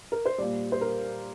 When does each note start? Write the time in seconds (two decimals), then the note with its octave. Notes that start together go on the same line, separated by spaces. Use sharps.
0.12 A#4
0.26 C5
0.38 A#2 G3 D5
0.72 C5
0.81 A#4